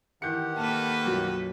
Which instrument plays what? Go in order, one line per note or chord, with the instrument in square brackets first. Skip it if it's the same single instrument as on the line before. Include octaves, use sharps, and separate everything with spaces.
[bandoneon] D#3 G4 F#5 [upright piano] E3 G6 C#7
[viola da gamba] A#3 A4 B4 [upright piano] A5 F6
[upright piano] B1 F#2 F3